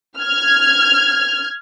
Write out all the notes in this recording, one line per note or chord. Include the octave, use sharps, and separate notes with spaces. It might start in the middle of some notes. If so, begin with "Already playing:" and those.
F6 G#6